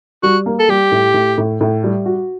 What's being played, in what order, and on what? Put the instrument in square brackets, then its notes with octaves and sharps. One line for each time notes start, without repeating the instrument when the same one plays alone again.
[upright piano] G3 [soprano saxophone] F#4
[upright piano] A#3
[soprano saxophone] A4
[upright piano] G3 [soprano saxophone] G4
[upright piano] A2
A2
A2
A2
G3
F#4